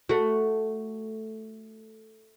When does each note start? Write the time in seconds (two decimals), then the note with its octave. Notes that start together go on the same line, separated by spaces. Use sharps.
0.09 A3 F#4